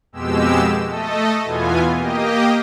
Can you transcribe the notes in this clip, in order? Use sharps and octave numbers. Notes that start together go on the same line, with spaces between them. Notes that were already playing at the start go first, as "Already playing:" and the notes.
F2 B2 G#3 G4 E6
A3 A4 D#5
E2 B2 E3 B3 F4 G#5
A#3 G4 D#5